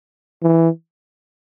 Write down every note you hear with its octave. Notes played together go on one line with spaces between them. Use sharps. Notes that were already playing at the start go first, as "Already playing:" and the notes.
E3